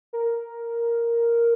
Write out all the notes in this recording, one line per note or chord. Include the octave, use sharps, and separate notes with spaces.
A#4